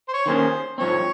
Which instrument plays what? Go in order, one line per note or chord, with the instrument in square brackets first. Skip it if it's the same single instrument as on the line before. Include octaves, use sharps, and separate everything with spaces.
[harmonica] C5
C#5
[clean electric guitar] D#3 A#3 C#4 G#4 [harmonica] C5
[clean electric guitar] G#2 F3 C4 [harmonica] C#5